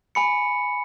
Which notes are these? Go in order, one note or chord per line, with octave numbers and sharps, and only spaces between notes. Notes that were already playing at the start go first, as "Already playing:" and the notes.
G#5 B5 C#7